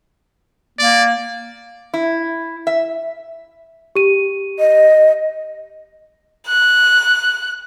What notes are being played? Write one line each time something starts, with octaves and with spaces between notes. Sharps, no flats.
A#3 D5
E4
E5
G4 D#7
D#5
F#6